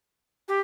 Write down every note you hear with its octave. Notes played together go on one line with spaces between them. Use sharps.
G4